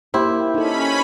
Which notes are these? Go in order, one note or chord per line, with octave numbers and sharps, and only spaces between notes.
A#3 E4 G4 C5
C#4 D#4 A4 B5